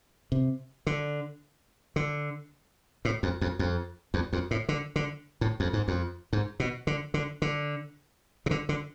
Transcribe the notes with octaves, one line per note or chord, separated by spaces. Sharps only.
C3
D3
D3
A2
F2
F2
F2
E2
F2
A2
D3
D3
A2
F2
G#2
F2
G#2
B2
D3
D3
D3
C3
D3
D3